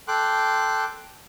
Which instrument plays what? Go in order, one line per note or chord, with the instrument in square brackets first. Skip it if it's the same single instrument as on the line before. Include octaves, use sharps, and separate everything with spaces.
[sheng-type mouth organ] A4 G5 C6 D6 F#6